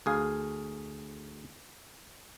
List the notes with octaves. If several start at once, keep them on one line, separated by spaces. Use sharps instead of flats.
D2 G#4 F5